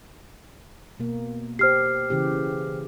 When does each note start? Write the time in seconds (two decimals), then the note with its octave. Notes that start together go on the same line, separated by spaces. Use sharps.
1.00 B2 A#3
1.59 G4 C5 F6 C7
2.10 C#3 E3 G4